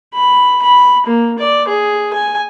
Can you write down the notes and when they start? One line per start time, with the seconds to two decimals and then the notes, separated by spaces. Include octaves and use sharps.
0.15 B5
0.63 B5
1.06 A#3
1.39 D5
1.68 G#4
2.13 G#5